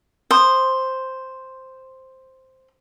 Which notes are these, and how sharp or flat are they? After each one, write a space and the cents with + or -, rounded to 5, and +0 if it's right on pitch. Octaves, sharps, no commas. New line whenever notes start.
C5 +0 D#6 -20